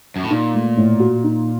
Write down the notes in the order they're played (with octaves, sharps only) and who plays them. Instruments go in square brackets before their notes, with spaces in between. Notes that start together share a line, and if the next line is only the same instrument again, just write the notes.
[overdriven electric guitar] F#2
A2
[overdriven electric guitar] A#2 [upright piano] D#4
[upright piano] A3
A2
F#4
D#4